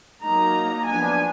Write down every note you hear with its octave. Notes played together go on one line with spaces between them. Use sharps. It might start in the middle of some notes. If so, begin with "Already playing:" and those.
F#3 A#3 D#4 A#5
F3 B3 D4 G#5